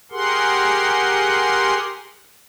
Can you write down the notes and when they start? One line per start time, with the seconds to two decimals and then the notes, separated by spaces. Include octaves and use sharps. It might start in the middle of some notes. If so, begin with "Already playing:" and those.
0.11 G4 G#4 A#4 F#5 C6